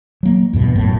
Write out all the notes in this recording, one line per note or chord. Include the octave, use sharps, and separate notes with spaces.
F#3 A#3
E2 G2 B2
G1 F#2 A2